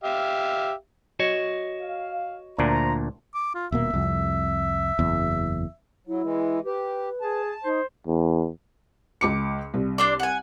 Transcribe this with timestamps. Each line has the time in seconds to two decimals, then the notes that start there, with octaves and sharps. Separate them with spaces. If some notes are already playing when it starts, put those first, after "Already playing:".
0.04 G4 E5 F5
1.19 F#4 C#5 D#5
1.81 F5
2.58 D2 A#2 D4 F4 C5 A#5
3.35 D6
3.55 F4
3.72 D#1 B2 A#3 E5
3.94 C2 F2
4.99 F#1 E2
6.07 F#3 E4
6.22 E3 G#3
6.65 G4 B4
7.22 G#4 A5
7.64 D#4 C5
8.07 E2
9.21 C#2 D6 C#7
9.74 C2
9.98 D4 C5 D5
10.20 F#5 G#5